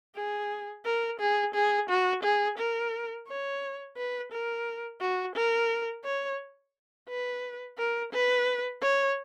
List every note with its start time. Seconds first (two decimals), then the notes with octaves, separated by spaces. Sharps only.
0.16 G#4
0.85 A#4
1.20 G#4
1.54 G#4
1.89 F#4
2.23 G#4
2.58 A#4
3.28 C#5
3.97 B4
4.32 A#4
5.00 F#4
5.36 A#4
6.04 C#5
7.09 B4
7.78 A#4
8.13 B4
8.82 C#5